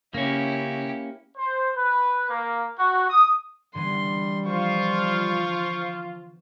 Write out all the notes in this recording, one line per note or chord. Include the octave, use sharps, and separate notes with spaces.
C#3 A#3 C#4 E4 G4
C5
B4
A#3
F#4
D#6
D3 E3 G3 B3 C6
F3 F4 C5 C#6